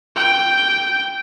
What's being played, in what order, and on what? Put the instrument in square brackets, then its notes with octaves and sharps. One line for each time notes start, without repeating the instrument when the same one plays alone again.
[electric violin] G5